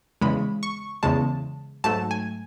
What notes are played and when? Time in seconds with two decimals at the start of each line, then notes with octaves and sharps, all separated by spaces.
0.21 E2 C#3 G#3 B5
0.63 C#6
1.03 E2 C#3 G#3 A5
1.84 G#2 F#3 A3 A5
2.11 G#5